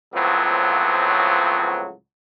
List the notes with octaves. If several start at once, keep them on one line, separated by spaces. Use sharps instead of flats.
C#2 A2 F3 F#3 B3 C4